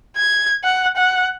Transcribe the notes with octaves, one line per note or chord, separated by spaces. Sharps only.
G#6
F#5
F#5